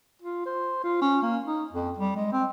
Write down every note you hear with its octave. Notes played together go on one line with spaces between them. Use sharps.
F4
C5
F4
C#4
A#3
D#4
F2
G3
G#3
C4